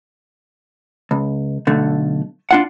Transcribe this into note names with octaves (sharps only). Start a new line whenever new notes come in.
C#2
B1 D3 A3
D4 F4 F#5